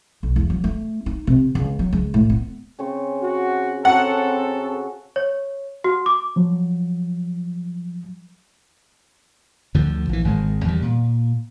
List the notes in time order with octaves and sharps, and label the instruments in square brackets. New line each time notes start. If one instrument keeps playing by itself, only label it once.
[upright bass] B1
E2
F#3
A3
D#4
C3
C#2
F#3
C#2
A2
B3
[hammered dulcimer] C#3 C4 C#6
[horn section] F#4
[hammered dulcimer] C#3 F#4 A#5 [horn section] C4 A4 [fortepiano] F#5
[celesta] C#5
F#4
D6
[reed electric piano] F3 F#3
[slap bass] D2 D3 F3
A#1 E3
G#1 D#3 G#3
E2 D#3 G3
A#2